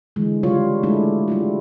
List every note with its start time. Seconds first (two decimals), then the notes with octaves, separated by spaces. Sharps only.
0.16 D3 E3 G#3
0.43 C#3 G3 F4 C#5
0.83 G#3 A3 D4 E4
1.28 G3 E4 F4